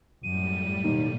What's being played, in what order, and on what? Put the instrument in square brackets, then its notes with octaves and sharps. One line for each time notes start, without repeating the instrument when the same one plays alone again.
[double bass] F#2 [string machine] A2 G3 [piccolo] D#7
[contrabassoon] D#2 [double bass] B2 A#3